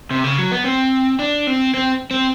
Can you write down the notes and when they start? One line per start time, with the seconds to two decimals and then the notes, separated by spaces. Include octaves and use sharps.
0.11 C3
0.24 C#3
0.38 F#3
0.51 B3
0.65 C4
1.19 D4
1.47 C4
1.74 C4
2.11 C4